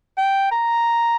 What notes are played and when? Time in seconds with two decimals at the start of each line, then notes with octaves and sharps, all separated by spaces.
0.18 G5
0.52 A#5